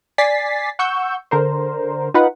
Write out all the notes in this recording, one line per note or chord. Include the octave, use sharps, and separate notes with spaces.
D5 G#5 A6 B6 C7
F#5 C#6 E6 G6
D3 A#4 C5
D#4 F4 B4 F#5